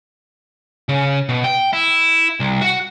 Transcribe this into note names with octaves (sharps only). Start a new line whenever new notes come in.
C#3
B2
G5
E4
C2
F#4